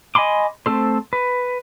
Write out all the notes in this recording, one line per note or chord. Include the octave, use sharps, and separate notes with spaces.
D#5 G#5 B5 C6 D6
A3 C4 A4 C5
B4